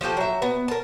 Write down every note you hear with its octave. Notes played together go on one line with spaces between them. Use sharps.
F3 F#4 G4 A4
F#3 E5
B3
A#4 A5